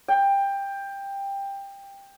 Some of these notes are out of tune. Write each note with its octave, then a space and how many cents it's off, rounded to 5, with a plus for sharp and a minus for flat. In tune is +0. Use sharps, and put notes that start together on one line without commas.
G5 +15